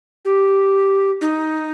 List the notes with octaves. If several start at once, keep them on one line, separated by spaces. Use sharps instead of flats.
G4
D#4